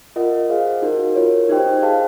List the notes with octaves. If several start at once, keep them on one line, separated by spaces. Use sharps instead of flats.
F4 A#4 D#5 F#5
G#4 C5 F5
D#4 F#4 A#4
F4 A#4 C#5
D#4 G4 C5 D#5 G5
G#4 C5 F5 A5